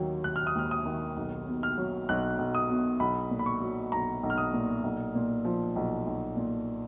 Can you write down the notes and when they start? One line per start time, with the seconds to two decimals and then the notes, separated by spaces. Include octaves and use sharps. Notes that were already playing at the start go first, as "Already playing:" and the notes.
Already playing: D#2 D#3 F#3
0.24 D#2 F#6
0.36 F6
0.47 D#6
0.55 D#2 F6
0.71 D#6
0.86 D#3
1.17 B1
1.48 B2
1.63 F6
1.78 F#3
2.09 B1 F#6
2.39 B1
2.55 D#6
2.70 B2
3.00 B1 B5
3.31 A#2
3.39 B5
3.46 C#6
3.61 F#3
3.92 B1 A#5
4.23 B1
4.30 F6
4.38 D#6
4.53 A#2
4.84 B1
5.15 A#2
5.45 F3
5.76 B1
6.07 B1
6.37 A#2